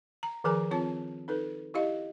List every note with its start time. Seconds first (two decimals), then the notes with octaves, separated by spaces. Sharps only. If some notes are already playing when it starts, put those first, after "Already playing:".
0.23 A#5
0.44 D#3 F3 G#4 A#4 G#5 A#5
0.71 C4 F4 C#5 A5
1.28 D#4 A4 B4
1.74 E4 G4 D#5 F5